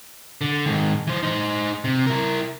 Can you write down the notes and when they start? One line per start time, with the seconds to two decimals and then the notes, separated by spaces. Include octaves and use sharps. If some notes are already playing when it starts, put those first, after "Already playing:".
0.41 D3
0.66 G#2 D#3
1.07 E3 C5
1.23 D#4 C5
1.84 C3
2.07 E4 A#4